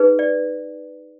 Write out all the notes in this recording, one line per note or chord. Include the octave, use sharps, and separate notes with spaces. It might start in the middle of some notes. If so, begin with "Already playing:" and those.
Already playing: D#4 G#4 B4
D5